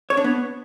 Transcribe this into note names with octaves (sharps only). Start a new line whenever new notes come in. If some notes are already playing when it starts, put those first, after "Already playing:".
C#5
D4
B3